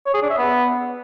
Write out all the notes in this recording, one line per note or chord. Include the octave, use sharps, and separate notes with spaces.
C#5
G#4
D4
E5
B3